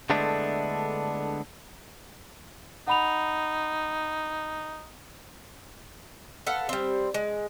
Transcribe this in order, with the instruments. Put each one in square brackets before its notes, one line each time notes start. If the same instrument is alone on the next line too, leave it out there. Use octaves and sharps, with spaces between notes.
[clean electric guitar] D3 G#3 A3 B3 D4 E4
[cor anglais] D#4 [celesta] F#5 B5 F7
[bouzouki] A4 B4 F5 F#5
G3 C4
G#3